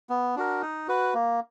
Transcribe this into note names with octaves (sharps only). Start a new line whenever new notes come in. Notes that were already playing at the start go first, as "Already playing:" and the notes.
B3
D4 F#4 A#4
D#4
F#4 B4
A#3